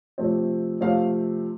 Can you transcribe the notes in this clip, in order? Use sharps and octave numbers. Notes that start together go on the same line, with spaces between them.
C3 F3 A3 C4
C3 F3 A3 C4 F5